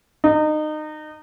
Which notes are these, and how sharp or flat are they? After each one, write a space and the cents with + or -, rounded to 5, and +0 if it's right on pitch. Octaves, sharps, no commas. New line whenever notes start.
D#4 -25